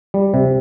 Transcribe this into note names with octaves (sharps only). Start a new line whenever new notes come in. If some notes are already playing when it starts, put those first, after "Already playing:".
G3
C3